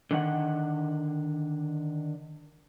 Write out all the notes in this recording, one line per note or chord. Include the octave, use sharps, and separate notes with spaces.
D3 D#3 F#5